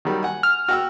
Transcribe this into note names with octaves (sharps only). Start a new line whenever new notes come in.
D#3 F#3 G3
F#5 G#5
F6
F#4 G5 E6